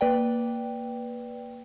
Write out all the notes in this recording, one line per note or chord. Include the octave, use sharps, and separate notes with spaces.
A#3 B4 D5 G5